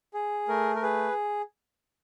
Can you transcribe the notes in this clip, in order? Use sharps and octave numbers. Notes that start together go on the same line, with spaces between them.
G#4
A3 A#4
A#4
G#4 B4